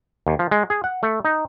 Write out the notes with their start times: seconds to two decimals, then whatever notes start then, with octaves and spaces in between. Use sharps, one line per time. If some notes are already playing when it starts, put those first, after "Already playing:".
0.27 D#2
0.39 F3
0.51 G#3
0.70 G#4
0.84 F#5
1.03 A3
1.25 D#4